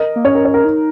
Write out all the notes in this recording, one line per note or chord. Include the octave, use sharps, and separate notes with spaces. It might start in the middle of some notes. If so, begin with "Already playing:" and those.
Already playing: A#4 D#5
A#3
C#4 C#5
A#4
C#5
A#4
D#4